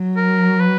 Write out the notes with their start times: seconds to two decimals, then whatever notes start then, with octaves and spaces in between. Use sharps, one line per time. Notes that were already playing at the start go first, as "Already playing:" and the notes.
Already playing: F#3
0.16 A#4
0.60 B4